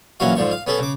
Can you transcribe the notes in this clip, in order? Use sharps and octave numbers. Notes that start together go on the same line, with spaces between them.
A#1 E3 F#3 C#4 F#4 F5
G#2 D3 F3 C#6
F5
B3 C#4 G#4 A4
C#3 D6